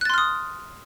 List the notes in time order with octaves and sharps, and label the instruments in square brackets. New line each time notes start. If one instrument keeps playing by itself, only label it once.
[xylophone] F#6
A6
C6
F6
D#6